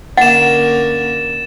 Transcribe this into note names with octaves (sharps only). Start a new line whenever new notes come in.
D3 A#3 C#4 F#5 A6 E7